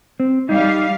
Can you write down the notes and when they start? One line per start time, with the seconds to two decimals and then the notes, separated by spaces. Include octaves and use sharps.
0.20 C4
0.49 G3 D#4 F5